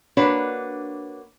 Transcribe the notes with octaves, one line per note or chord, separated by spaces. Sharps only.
A#3 D4 F#4 B4 C#5